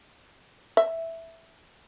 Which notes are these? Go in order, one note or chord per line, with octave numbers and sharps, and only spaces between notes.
E5